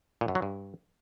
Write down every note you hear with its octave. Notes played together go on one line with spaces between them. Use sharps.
A#2
F#2
F#3
G2